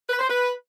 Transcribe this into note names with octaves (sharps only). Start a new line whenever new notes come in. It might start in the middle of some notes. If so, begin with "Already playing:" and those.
B4
C5
B4